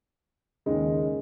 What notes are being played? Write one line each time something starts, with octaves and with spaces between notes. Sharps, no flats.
D#2 C#3 G#3 D#4